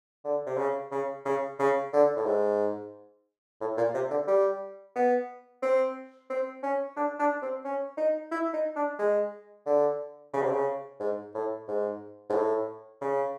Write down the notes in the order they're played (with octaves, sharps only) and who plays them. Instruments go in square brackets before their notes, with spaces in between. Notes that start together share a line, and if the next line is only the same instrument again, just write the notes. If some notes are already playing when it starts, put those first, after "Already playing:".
[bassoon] D3
C3
C#3
C#3
C#3
C#3
D3
A2
G#2
A2
A#2
C3
D3
G3
B3
C4
C4
C#4
D4
D4
C4
C#4
D#4
E4
D#4
D4
G#3
D3
C#3
C3
C#3
G#2
A2
G#2
G#2
A2
C#3